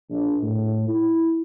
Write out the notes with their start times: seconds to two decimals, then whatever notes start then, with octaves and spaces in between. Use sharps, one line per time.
0.11 A#1
0.43 A2
0.88 E4